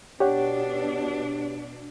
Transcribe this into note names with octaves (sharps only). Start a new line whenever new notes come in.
B2 D4 G4 C#5 F#5